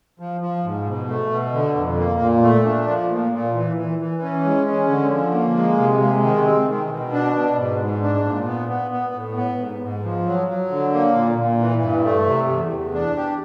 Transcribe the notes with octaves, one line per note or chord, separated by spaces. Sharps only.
F3
F3
G#2
B2
A3
B2
D3
F2
A#3
A#2
A3
D4
F3
A#2
A#2
E3
E3
E3
C#4
G#3
C#4
D3
F3
A#3
G#3
C3
G#3
D#3
C4
D#3
B2
D4
B2
G#2
G#2
D4
A#2
B3
B3
B3
A2
B3
G#2
G#2
F3
F#3
F#3
D3
A#3
A#2
A#2
E3
G2
A3
C3
E2
E2
D4
G4